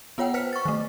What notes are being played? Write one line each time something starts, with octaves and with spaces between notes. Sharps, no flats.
B3 F4 C#5 F#5 G5
B4 C5 F6 B6 C#7
C#6 A6
D#3 A3